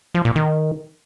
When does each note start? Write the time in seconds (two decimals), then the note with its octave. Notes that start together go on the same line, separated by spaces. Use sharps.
0.15 F3
0.25 A#2
0.36 D#3